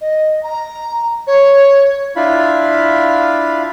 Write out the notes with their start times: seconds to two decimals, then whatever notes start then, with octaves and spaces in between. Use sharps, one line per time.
0.01 D#5
0.43 A#5
1.27 C#5
2.16 D4 E4 F4 F5 B5